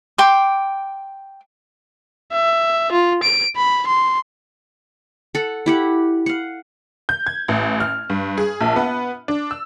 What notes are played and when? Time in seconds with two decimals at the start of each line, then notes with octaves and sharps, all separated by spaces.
0.18 G5 C6 D6
2.33 E5
2.92 F4
3.23 D7
3.57 B5
3.88 C6
5.35 A4 F#5
5.66 E4 G4 F#5
6.26 F5 F#5
7.09 G6
7.27 G#6
7.48 A1
7.80 F6
8.10 G2
8.38 G#4
8.61 A#1
8.76 B3
9.28 D4
9.51 E6